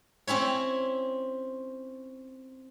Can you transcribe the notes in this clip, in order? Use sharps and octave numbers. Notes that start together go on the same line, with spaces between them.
C4 C#4 E4 C#5